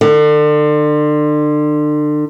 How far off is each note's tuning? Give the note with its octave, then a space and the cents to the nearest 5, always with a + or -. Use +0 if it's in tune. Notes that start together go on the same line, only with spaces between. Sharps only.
D3 +35